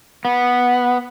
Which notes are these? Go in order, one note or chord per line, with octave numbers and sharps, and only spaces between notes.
B3